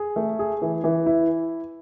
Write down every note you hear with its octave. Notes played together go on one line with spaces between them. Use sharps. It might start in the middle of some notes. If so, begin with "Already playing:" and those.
Already playing: G#4
A3
G#4
E3
E3
E4